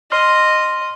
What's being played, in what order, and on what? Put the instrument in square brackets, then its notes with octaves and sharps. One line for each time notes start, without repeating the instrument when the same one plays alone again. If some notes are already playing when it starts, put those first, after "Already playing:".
[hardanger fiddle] D#5 [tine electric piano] C6 F6